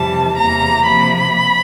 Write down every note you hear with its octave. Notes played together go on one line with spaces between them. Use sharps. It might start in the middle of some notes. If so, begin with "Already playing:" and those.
Already playing: F2 C3 E3 G3 A5
E2 C3 E3 G3 A#3 A#5
C3 F3 A#3 B5